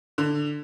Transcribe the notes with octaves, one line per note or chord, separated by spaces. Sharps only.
D3